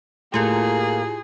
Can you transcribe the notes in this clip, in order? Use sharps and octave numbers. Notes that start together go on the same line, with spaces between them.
A2 A#3 E4 F4 G4 G#4